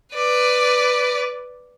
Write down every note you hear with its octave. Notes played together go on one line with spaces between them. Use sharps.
B4 D5